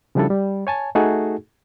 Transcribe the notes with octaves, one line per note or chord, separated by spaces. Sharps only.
C#3 F3 G3 D4 E4 A4
G3
C#5 G#5 A5
A3 D#4 F#4 G#4 A4